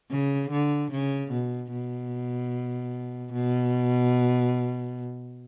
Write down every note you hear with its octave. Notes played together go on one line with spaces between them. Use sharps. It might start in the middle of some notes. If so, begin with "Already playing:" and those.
C#3
D3
C#3
B2
B2
B2